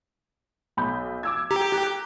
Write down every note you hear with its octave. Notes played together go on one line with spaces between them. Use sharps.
B1 B5 G6
D6 E6 G#6
G4 A#5
A#5 F#6